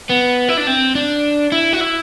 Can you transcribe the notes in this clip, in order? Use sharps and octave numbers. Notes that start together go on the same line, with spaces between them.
B3
E4
D4
C4
D4
E4
F#4
E4